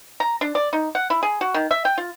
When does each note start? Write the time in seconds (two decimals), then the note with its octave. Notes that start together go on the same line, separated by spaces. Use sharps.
0.20 A#5
0.41 D4
0.55 D5
0.73 D#4
0.95 F#5
1.10 E4
1.23 G#4
1.41 F#4
1.54 D#3
1.71 E5
1.85 G5
1.98 F4